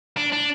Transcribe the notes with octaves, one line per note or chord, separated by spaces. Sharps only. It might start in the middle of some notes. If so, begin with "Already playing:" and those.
D4
D4